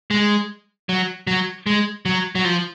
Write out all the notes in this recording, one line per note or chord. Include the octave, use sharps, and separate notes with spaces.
G#3
F#3
F#3
G#3
F#3
F#3
F3